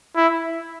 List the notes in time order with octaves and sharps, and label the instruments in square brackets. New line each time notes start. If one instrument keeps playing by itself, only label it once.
[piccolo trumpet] E4